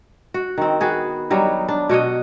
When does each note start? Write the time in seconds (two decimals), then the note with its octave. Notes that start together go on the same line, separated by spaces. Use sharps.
0.34 F#4
0.58 D#3 C4
0.81 B3 F#4 G#4
1.30 F#3 G3 D#4 F#4
1.69 D4
1.89 B2 F#4 C#5 D#5